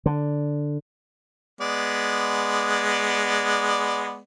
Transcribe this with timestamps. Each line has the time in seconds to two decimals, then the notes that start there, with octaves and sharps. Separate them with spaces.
0.06 D3
1.61 G#3 B3 D5